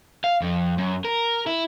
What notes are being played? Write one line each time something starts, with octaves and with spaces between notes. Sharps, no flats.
F5
F2
F#2
A#4
E4